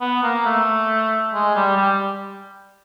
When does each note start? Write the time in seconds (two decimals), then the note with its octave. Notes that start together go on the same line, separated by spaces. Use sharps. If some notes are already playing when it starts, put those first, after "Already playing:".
0.01 B3
0.23 A#3
0.46 A3
1.33 G#3
1.55 G3
1.77 G3